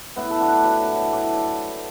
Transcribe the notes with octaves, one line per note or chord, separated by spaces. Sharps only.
A2 B3 E4
A4
F#3 D4 F#4
F#3 F#4 B4
A2
A2 A4 D5